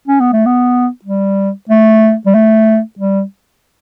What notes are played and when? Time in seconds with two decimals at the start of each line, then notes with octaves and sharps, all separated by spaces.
0.08 C#4
0.21 B3
0.33 A3
0.46 B3
1.05 G3
1.70 A3
2.26 G3
2.35 A3
2.99 G3